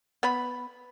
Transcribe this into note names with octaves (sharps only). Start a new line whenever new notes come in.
B3 B5